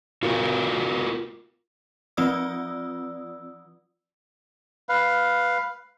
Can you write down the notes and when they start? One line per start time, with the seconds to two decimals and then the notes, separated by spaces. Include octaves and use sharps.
0.23 F4 F#4 A#4
2.17 F3 C4 F4 D5 D#6 E6
4.89 B4 F5